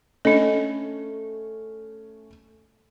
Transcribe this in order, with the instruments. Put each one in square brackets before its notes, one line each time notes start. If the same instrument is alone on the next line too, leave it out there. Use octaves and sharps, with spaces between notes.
[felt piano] A3 C#4 [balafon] D4 A4 [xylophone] D#5